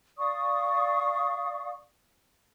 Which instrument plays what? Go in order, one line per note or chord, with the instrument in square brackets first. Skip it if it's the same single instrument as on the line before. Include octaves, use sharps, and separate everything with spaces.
[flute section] D5 F5 C#6 D#6